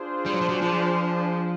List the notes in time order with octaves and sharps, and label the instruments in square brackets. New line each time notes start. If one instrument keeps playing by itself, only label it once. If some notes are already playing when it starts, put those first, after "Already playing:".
Already playing: [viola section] D4 F4 G#4 C5
[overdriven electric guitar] G3
F#3
F3
F#3
F3